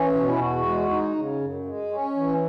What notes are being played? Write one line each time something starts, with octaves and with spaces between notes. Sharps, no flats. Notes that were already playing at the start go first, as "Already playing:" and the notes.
Already playing: E3 C#4
B2
E4
E2 F#4
G#3
D#4
C#3
F#2
G#3
C#4
E3